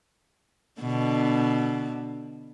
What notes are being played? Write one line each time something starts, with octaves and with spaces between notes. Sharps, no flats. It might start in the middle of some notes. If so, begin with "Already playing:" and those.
B2 D3